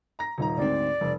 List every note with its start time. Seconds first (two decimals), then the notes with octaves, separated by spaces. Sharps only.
0.19 A#5 A#6
0.38 D#1 D#4 A#5
0.57 D2 G#2 C4 D5
1.01 F1